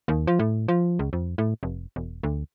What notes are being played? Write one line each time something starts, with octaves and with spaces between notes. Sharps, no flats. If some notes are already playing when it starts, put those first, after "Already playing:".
D#2
F3
A2
F3
C#2
F2
A2
F1
E1
D2